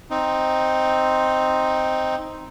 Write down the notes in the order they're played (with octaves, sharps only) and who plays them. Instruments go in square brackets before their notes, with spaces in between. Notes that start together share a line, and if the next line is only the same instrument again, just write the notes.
[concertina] C4 D#4